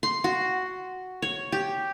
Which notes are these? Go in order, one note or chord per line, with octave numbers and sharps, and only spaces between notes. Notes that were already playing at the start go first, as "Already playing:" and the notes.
C6
F#4
C#5
G4